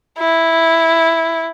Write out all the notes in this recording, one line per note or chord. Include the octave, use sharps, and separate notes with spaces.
E4